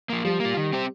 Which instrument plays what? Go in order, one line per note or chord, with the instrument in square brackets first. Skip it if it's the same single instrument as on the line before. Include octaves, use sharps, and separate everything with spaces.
[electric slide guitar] F3 A#3
[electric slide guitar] F3 [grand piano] G3
[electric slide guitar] A#3 F4
D#3
C4 G4 C5